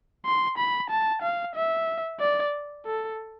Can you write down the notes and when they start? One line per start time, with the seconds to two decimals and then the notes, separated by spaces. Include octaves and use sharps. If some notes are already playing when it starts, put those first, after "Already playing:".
0.26 C6
0.58 B5
0.90 A5
1.22 F5
1.55 E5
2.20 D5
2.86 A4